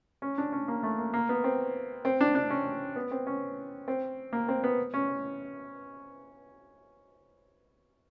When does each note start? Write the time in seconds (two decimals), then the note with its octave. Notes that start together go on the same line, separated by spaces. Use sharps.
0.22 C#4
0.38 D4
0.52 C#4
0.68 A#3
0.83 A3
0.98 A#3
1.14 A#3
1.29 B3
1.44 C4
2.05 C4
2.21 D4
2.35 D4
2.50 C#4
2.96 B3
3.11 C4
3.27 C#4
3.88 C4
4.33 A#3
4.48 C4
4.64 B3
4.94 C#4